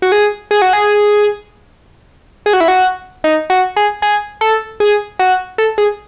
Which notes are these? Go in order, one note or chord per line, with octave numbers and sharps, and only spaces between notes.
F#4
G#4
G#4
F#4
G#4
G#4
F#4
E4
F#4
D#4
F#4
G#4
G#4
A4
G#4
F#4
A4
G#4